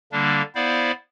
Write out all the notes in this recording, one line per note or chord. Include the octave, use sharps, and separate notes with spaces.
D3 G3 A#3 D4
B3 E4 C5 D5 F5